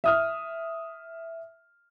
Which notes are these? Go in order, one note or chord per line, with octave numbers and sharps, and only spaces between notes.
E5 D#6 F6